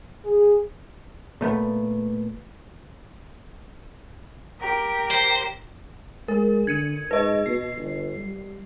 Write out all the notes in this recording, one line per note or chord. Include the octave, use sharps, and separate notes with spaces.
G#4
A#2 A3 B3
G4 A#4
C5
G#3 A#4
D3 G#6 C#7 D#7
G#2 B4 D#5
B2 C7
G1
G3